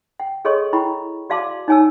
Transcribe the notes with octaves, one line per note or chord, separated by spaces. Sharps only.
G5
G#4 A4 C#5 D#5 C6 C#6
E4 G5 B5 C#6
F#4 D5 F5 A5 C6 D6
D#4 C#5 G#5 A5 E6